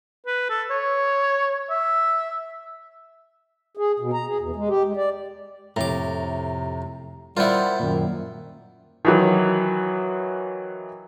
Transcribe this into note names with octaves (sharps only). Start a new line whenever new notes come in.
B4
A4
C#5
E5
G#4
B2
A#5
G#4
E2
G#3
G4
G#3
D5
F2 A2 C3 A#5 D6
G3 E4 F4 A#4 C5 F#5
F#2 A#2 D#3
D#3 E3 F#3